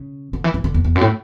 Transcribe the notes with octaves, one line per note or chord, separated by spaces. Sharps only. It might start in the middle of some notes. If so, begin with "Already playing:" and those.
Already playing: C#3
D3
E3
E3
D3
E2
E2
F#2
A2